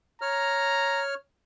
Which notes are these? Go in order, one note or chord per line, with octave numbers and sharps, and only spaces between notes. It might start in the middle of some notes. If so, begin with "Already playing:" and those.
C#5 A#5 F6